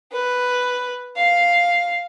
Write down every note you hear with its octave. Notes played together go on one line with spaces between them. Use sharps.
B4
F5